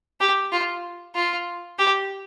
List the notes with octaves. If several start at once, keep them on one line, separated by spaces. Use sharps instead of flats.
G4
F4
F4
G4